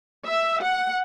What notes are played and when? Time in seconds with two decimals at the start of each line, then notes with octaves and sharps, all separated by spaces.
0.25 E5
0.60 F#5